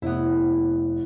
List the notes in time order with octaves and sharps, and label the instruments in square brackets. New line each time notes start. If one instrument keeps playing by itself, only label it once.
[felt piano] F1 [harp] B3 E4